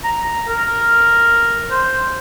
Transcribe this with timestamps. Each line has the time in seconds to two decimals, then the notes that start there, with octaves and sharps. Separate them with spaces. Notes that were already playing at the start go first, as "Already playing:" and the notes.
0.04 A#5
0.48 A#4
1.71 C5